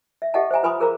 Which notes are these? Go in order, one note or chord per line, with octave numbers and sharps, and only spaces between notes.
E5
G4 A4 D#5 E5 F#5 A5
C5 E5 G#5 A#5
F4 B4 G#5 B5 C6 D#6
G#4 A#4 C5 F5 A#5 D6